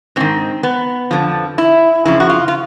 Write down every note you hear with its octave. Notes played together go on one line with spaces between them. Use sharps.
G#2 D#3 C4
B3
F2 D3 F3
E4
F2 C#3 F3 E4
F#4
F4
F4